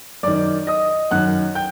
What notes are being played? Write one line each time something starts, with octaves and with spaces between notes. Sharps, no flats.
F#2 D#3 D5 D6
D#5 D#6
F#2 D#3 F#5 F#6
G5 G6